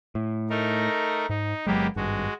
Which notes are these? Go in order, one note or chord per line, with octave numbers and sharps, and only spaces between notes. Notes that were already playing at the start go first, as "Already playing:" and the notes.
A2
A3 D#4 A#4
G#2 D#4
G1 F#3 G#3 A#3 B3 G4
G#1 G2 G#3 F#4